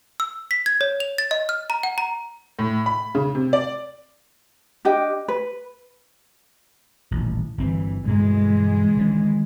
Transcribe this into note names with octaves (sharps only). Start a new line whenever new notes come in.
E6
B6
G#6
C#5
F7
A6
D#5
F6
A#5
F#5
A#5
A2
B5
C#3
C3
D5
D4 G4 D#5 G5
B4
D#1 A1
G1 E3 C4
G2 B2 D3 E3 G#3
D#3 F3 C#4